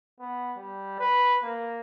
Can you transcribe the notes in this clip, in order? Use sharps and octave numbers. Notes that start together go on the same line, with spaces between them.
B3
G3
B4
A#3